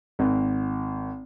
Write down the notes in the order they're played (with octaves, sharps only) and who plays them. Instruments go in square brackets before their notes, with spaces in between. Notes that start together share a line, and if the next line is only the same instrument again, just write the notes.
[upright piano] G#1